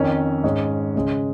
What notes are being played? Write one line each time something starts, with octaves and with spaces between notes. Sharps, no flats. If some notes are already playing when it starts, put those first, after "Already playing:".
Already playing: F2 D#3 C#4
G#2 G#3 C#4
C#3 G#3 C#4